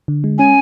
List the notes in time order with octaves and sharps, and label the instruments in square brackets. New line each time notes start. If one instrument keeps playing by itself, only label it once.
[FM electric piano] D3
G#3
[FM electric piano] C#4 [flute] G#5